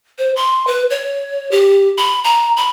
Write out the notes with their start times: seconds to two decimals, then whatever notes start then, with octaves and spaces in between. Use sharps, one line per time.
0.18 C5
0.36 C6
0.67 B4
0.90 C#5
1.52 G4
1.98 B5
2.24 A#5
2.57 B5